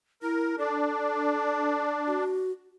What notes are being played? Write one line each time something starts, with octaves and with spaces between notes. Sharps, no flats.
E4 A#4
D4 A4
F#4